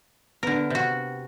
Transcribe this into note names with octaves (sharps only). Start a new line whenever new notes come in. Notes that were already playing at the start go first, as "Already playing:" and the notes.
D3 B3 A#4
C3 F#4